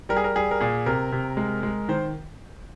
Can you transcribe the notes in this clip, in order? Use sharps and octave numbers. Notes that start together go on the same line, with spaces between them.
G3 A#4
G#4
A#4
G3 G#4
A#4
A#2 G#4
C3 A#4
C3
G#3
G#3
D#3 C5